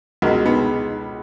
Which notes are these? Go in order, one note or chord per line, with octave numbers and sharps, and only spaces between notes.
C#2 B2 F#4 A#4
G#3 B3